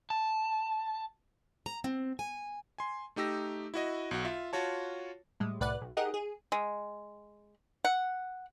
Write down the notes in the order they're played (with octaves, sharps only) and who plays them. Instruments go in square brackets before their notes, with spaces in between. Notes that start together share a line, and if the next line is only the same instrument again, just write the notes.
[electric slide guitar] A5
[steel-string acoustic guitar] A#5
C4
G#5
[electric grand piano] G#5 C6
A3 D#4 G4 E6 A#6
E4 F#4 D#5
B1 F#4
F4 E5
F4 F#4 C#5 A5
[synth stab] A2 G3 G#3
C2 A2 B4 D5 F#5 F#6
B1
D#4 G4 G#4 A#4 D#5 F#5
G#4
[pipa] G#3
F#5